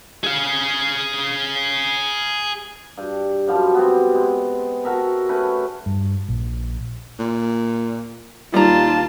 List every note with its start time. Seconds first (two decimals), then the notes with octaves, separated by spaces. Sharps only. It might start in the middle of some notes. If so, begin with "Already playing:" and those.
0.24 G#4 F5
2.97 G2
3.47 F#2 F3 G3
3.75 B3 C4
4.14 G#3
4.84 F#4 A#4 E5 A5
5.29 A3 C#4 B4
5.86 G2
6.28 A#1
7.19 A#2
8.54 D#2 G3 D#4 F4 A5 A#5